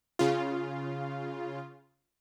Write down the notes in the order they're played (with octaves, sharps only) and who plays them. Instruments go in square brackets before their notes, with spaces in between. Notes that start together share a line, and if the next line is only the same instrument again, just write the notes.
[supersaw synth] C#3 F4